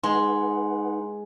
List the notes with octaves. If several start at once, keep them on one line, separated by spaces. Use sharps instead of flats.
G#3 D#4 B4 F#5 C6